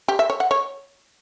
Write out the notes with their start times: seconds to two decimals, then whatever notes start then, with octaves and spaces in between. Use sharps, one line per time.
0.08 G4
0.19 E5
0.30 C#5
0.40 F#5
0.51 C#5